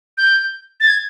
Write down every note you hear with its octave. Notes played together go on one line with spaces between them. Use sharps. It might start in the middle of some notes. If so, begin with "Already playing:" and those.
G6
A6
G#6